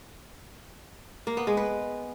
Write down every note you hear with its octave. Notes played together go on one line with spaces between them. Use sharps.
A#3
B3
G#3
B4